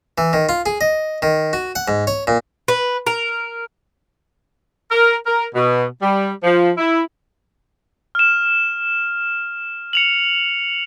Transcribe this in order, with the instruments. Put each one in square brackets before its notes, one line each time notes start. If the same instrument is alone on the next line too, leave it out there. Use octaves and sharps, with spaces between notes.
[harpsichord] E3
D#3
F4
G#4
D#5
D#3
F#4
F#5
G#2
C#5
A#2
[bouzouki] B4
A#4
[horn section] A#4
A#4
B2
G3
F3
E4
[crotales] F6 E7
C#7 F7 F#7